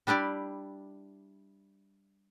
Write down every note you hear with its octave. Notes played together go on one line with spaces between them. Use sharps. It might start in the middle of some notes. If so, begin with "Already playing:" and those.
G3 D4 E4 G4 D5